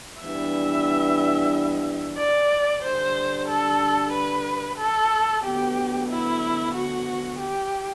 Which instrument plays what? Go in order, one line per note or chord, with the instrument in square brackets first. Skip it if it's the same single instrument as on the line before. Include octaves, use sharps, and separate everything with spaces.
[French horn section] E3 G3 B3 D4 [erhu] E5
[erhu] D5
[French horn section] D3 G3 D4 [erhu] C5
[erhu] A4
B4
A4
[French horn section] D2 D3 F#3 B3 [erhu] G4
[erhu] E4
F#4
G4